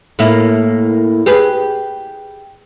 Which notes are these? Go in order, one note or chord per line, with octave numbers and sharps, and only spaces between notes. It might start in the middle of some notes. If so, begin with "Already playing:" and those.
A2 A#3 E4
G4 G#4 B4